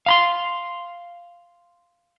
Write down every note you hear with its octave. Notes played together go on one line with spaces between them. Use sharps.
F5 B5 C6